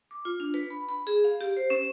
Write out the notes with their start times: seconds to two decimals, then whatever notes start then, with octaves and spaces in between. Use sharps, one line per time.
0.11 D6
0.25 F4
0.40 D4
0.54 B4
0.70 B5
0.89 B5
1.07 G#4
1.24 F5
1.41 G4
1.57 C5
1.70 C#4